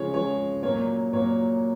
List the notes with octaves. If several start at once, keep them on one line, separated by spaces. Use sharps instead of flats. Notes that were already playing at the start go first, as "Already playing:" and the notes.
Already playing: C#3 F3 G#3 C#5
C#3 F3 G#3 C#5
A#2 F#3 A#3 C#5
A#2 F#3 A#3 C#5